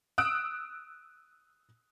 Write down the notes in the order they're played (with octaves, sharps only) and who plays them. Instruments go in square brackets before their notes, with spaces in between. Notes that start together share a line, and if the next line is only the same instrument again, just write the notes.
[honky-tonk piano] D#6 E6 F#6 D7